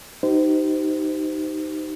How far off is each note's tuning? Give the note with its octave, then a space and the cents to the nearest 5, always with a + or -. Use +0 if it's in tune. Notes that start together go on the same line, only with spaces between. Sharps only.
D#4 +0 G4 -35 C5 -30